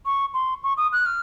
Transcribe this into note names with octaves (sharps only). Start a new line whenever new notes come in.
C#6
C6
C#6
D#6
F#6
F6